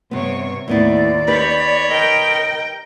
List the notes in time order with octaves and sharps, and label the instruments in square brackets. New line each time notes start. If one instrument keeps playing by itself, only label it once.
[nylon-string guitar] G2 B3 [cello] C3 C#5
[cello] D#2 [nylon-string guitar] A2 B3 E4 [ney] D5
[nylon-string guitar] D#4 G4 B4 [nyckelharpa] C#5 B5
[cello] A#4 G5 [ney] D#5